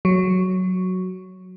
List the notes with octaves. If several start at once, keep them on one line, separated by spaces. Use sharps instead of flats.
F#3